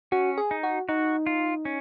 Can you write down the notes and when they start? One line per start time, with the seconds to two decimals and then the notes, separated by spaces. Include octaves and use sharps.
0.12 C#4 F#4
0.38 G#4
0.51 D#4
0.63 F#4
0.89 D#4 F#4
1.26 F4
1.65 C#4